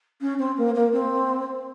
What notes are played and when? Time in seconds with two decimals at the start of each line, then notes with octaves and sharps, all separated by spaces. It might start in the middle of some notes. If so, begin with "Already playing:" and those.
0.21 C#4
0.38 C4
0.57 A#3
0.75 A#3
0.93 C4